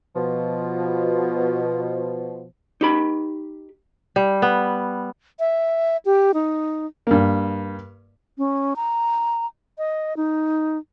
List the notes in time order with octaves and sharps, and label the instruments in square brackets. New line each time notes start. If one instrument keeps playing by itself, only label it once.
[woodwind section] B2 F3
[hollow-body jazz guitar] D#4 G4 B5
[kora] G3
B3
[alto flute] E5
G4
D#4
[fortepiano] G2 A#3
[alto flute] C#4
A#5
D#5
D#4